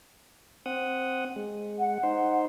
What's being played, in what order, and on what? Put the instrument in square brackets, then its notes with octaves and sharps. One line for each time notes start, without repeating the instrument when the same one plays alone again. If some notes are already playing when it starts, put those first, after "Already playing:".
[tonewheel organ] C4 F#5 D#6
G#3
[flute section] F#5
[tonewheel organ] D#4 C5